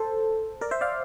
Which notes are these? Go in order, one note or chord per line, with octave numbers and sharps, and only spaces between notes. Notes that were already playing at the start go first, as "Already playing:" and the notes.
Already playing: A4 C5
A#4 D5
C5 E5
D5 F5